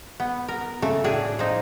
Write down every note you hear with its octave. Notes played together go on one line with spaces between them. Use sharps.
B3
A#4
C#3 A3 A4
A2 D4 G#4
F3 D#4